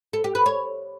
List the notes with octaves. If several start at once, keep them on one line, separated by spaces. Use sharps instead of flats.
A4
G4
B4
C#5